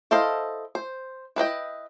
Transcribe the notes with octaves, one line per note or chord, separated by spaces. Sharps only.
E4 A4 C5 D#5 F5
C5
E4 B4 D#5 G5